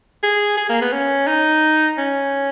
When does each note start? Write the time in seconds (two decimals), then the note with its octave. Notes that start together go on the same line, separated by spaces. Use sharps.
0.23 G#4
0.57 G#4
0.69 A#3
0.81 B3
0.92 C#4
1.27 D#4
1.98 C#4